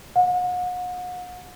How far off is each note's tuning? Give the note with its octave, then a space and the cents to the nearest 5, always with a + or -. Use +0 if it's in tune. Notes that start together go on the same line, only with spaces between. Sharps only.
F#5 -40